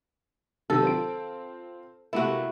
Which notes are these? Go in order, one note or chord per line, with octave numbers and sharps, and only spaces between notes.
C3 D#3 F#3 A4
C4 F4 D7
C3 A3 A#3 E4 F#4